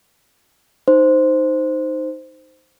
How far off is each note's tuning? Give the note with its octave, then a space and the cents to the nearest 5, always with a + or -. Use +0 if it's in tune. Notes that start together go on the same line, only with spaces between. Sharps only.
D#4 +0 C5 -5